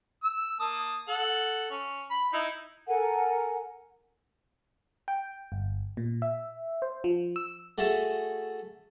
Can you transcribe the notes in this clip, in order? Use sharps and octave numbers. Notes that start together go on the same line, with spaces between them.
E6
A#3 A5 D#6
A4 F#5
C#4
B5
D#4 E4
A4 A#4 F#5 G#5
G5
G1
A#2
E5
C5
F3
E6
A3 F#4 G#4 A4 E5 A5